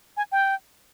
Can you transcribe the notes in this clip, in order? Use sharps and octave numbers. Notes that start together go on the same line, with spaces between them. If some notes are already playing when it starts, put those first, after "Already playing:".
G#5
G5